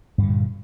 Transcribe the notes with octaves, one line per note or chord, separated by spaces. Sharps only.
G2 A#2 D3